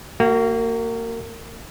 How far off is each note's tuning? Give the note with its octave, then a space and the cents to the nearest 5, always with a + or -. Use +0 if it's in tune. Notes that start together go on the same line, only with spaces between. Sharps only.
A#3 -25 F#4 +30